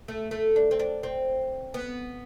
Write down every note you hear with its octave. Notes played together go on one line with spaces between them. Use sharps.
A3
A3
D4
C4
D4
C4
B3